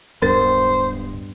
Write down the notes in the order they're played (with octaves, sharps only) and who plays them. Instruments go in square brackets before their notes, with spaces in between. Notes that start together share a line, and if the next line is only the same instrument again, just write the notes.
[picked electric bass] D1 B3 [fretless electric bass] G2 [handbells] A#4 A6 [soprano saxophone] C5